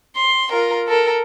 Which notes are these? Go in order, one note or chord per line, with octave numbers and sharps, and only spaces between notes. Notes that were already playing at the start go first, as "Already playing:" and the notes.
C6
F4 A#4
A4 A#4